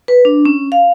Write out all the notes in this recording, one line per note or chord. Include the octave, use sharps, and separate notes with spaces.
B4
D4
C#4
F5